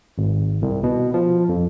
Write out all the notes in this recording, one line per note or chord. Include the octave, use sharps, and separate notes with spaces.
G#1
C2
B2
F3
F2